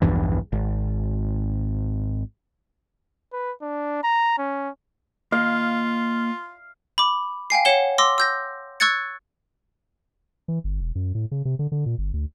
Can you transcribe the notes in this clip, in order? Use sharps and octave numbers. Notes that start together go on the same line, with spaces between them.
A#1 E2 G2 E3
G#1
B4
D4
A#5
C#4
A#3 F4 D#5 F5
B5 D6
F5 G5 G#5 C7
C#5 F#5 E7 G7
C6 D6 E6 A#6
E6 G6 A#6
C#6 E6 F#6 G#6 A6 C#7
E3
G1
E1
F#2
A2
C#3
C3
D3
D3
A#2
G1
D2